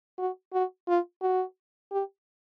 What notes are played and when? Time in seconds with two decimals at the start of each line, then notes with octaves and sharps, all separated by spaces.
0.18 F#4
0.53 F#4
0.88 F4
1.22 F#4
1.92 G4